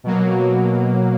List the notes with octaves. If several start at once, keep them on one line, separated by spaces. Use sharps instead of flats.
B2 F#3 A#3
B2 F#3 A#3